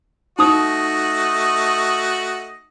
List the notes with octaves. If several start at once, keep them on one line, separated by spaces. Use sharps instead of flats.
A3 D#4 F#4 D#5 D#6